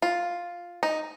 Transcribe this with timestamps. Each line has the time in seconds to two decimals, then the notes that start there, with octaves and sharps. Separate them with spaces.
0.02 F4
0.83 D#4